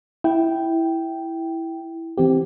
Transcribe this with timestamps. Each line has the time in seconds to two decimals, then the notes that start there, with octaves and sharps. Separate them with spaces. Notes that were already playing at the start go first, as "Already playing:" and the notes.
0.24 E4 G5
2.18 E3 C4 G4